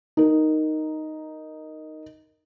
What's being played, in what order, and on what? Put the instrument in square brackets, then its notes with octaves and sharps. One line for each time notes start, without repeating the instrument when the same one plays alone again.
[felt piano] D#4 A#4